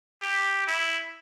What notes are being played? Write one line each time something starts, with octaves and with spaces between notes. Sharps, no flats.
G4
E4